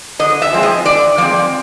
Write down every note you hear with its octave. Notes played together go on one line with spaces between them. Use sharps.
D3 D#5
E5
F3 G#3 C4
D#5
D3 D5
F3 G#3 C4 D5